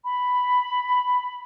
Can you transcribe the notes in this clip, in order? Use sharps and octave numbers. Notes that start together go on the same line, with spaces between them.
B5